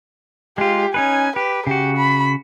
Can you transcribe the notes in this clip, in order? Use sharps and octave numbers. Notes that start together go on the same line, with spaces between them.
G#3 F4 G4
C#4 D#4 B4 G#5
G4 B4
C#3 F#4 G4
B5